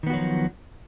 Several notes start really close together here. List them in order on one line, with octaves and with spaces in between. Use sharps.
D#3 B3 F#4 F#3 F3